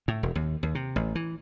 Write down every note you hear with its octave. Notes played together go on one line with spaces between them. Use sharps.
A2
E1
D#2
D#2
C3
A1
E3